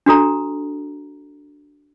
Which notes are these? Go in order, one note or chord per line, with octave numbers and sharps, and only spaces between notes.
D4 F#4 A4 A#5